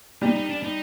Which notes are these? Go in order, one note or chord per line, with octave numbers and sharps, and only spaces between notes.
G3 D#4
D#4
D4
D#4